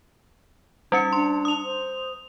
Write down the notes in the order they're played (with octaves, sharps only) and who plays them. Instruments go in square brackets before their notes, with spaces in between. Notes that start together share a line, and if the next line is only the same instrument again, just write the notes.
[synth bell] G3 C#4 C#7 [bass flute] D#4
[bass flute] D4 [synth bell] C6
[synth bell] D#6 F7
[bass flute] C5